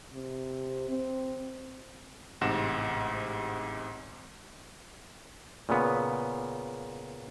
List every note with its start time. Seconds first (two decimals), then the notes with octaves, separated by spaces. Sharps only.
0.13 C3
0.89 C4
2.41 A1 G#2 C3 F#5 A#6 E7
5.69 A#2 C#3 B3